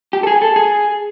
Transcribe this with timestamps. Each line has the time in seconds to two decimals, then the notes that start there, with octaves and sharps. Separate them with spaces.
0.13 G4
0.23 A4
0.27 G#4
0.42 A4
0.56 G#4